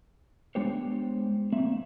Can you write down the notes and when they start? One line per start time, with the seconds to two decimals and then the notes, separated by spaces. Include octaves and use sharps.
0.55 G#3 B3 D4 G4 C5 C#5
1.52 A#3 C4 E5